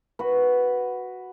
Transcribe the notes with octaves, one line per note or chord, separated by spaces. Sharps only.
F#4 B4